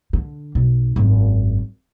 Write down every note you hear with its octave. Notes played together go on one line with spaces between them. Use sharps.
D3
B1
G#1 F#2